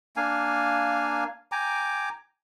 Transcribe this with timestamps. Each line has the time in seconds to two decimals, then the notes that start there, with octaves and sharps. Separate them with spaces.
0.16 A#3 D4 F5 G#5
1.52 G5 G#5 A#5 D6